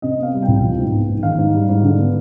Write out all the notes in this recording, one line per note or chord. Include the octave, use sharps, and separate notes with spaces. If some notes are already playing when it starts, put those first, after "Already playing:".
C3 D#5
B3 F5
G3
G5
C2
F3
G#2
B3
G#2
D#3 F5
G#2
G3
G#2
D3
B3